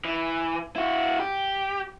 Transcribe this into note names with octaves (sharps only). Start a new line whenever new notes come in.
E3
E4 F#4
G4